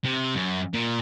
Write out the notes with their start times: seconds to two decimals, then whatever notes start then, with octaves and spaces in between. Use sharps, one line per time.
0.04 C3
0.35 F#2
0.74 A#2